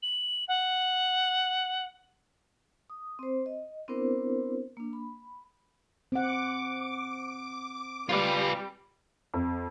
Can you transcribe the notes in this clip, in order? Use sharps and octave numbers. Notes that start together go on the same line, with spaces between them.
F#7
F#5
D#6
C4 C5
D#5
B3 C4 D4 E4 A#4 C5
A#3 D4
B5
C4 F#5 D6
G3 F4 B4
F2